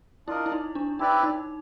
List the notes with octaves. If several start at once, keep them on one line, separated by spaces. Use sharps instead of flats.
D4 E4 F4 A#4 D#5
E4
D#4
D4
C4 D#4 E4 G4 B4 D5
D#4